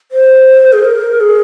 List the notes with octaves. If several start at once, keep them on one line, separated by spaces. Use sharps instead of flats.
C5
G#4
A#4
G#4